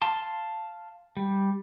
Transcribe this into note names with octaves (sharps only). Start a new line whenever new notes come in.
F5 A5 C6
G3